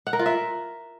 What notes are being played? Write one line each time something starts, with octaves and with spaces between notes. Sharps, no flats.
F#5
A#4
F4
E5